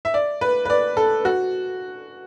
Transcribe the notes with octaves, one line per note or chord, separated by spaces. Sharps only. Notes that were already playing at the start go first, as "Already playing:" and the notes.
E5
D5
B4
B4
D5
A4
F#4